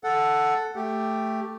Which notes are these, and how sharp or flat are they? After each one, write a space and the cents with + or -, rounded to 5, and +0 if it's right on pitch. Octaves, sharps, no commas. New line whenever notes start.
A4 +0 F#5 +0
A3 +0 G4 +0